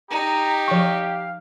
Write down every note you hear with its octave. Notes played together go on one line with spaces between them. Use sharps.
D#4 G4 A#5
F3 F5 C#6